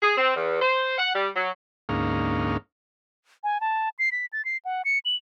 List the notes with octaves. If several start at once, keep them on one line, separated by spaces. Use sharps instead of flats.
G#4
C4
E2
C5
F#5
G3
F#3
D2 G#2 A#3 C#4 D#4 F5
G#5
A5
C7
B6
A6
C7
F#5
C#7
F#7